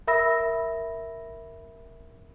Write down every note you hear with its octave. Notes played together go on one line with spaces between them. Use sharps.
A#4 E5 B5 E6 A#6